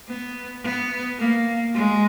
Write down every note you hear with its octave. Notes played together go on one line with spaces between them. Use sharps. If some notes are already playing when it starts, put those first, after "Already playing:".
B3
B3
A#3
G#3